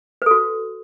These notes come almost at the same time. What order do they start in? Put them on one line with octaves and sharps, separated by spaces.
B4 A4 F#4